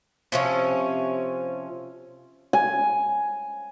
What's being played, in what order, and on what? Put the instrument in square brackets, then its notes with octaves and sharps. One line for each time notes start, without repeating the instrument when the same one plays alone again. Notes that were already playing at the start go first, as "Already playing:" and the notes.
[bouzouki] C3 F3 C#4
[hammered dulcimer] G#5